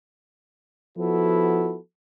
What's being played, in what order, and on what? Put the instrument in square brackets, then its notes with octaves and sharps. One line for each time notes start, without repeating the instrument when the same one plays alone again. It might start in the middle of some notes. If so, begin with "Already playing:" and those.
[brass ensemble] F3 B3 E4 F#4 A4